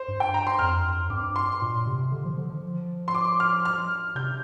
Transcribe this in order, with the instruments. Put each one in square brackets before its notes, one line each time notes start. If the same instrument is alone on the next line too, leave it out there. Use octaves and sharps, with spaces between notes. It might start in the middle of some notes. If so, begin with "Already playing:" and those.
Already playing: [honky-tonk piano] C5
[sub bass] G2
[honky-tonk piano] G5
A#5
C6
[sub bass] F2 [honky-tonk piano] F6
[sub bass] G2 [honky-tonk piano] D6
[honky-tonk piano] C6
[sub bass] A#2
C3
D3
F3
D3
F3
[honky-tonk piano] C6
D6
F6
F6
[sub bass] C3 [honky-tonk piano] G6